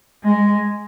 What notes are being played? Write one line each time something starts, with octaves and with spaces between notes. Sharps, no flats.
G#3